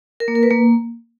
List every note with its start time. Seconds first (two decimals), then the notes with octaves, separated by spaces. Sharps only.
0.20 A#4
0.28 A#3
0.35 A#4
0.43 B4
0.50 A#3